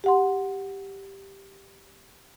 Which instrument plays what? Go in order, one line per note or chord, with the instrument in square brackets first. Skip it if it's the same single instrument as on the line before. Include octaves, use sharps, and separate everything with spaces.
[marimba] G4 F#5 C6